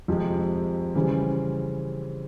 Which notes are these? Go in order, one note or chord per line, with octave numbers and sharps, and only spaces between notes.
F2 C3 F3 G#3
C#3 E3 G3 C4